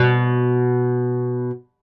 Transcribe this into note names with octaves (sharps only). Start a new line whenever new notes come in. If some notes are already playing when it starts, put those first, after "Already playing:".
Already playing: B2